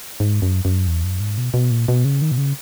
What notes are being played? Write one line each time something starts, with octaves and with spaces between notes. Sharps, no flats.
G#2
F#2
F#2
E2
F#2
G#2
B2
B2
A#2
B2
C#3
D#3
B2
C#3